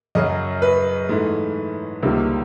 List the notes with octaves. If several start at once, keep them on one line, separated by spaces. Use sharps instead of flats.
F#2 C#3 F#3 D#5
B4
G#2 E3 A3
C#2 C3 D#3 G3 A#3